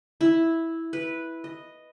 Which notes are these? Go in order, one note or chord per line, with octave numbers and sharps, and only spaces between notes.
E4
B4
D#5